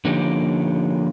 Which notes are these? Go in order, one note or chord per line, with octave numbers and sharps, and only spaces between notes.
D3 F3 A#3 C#4 D#4 G4